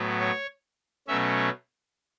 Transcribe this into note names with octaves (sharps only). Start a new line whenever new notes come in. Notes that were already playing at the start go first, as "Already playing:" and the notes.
Already playing: A2 F#3 B3
C#5
B2 F#3 A3 C#4 E5